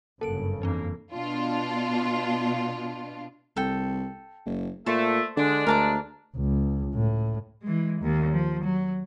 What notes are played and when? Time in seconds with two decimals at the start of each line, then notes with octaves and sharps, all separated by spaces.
0.21 G1 F#2 C#3 A#3 A4 A#4 D7
0.62 F2 E3 A#3 C4 D4
1.13 B2 D4 F4
3.57 C2 A4 G5
4.46 F#1
4.86 A#2 A3 C5 A5
5.37 D3 G#3 D4
5.67 D2 A#4 A5 D6
6.36 C#2
6.94 A2
7.62 E3 G#3
8.01 D#2
8.32 F3
8.64 F#3